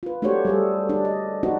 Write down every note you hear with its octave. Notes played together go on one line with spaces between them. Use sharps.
F4 B4
A3 D4 F#4 G4 C5 C#5
G3 G#4 A4
D4
D#5
D4 D#4 F#4 C5